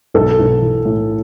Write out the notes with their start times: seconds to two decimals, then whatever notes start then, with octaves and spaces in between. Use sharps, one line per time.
0.14 B1 A4
0.38 B1
0.62 E3
0.85 A2